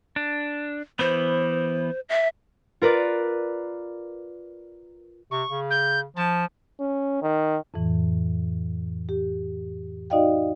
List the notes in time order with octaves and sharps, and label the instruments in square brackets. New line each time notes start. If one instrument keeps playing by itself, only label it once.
[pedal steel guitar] D4
[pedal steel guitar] E3 B3 [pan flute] C5
[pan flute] E5
[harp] F4 A#4 B4 D5
[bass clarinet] C3 [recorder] C#6
[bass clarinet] C#3
[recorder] G6
[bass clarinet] F3 [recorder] A5
[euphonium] C#4
D#3
[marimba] F2 A2 E3
G4
D#4 F#4 D5 D#5 F5 G5